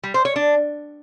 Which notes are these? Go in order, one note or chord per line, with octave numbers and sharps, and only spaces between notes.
G3
C5
C#5
D4